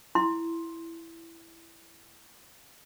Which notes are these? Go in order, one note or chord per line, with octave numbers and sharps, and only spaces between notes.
E4 C6